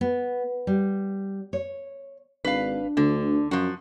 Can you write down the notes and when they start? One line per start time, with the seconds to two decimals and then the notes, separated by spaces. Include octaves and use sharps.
0.01 B3
0.67 G3
1.53 C#5
2.44 G#1 D4 B4 F5
2.97 D2 D3
3.51 F#2 F3 F#4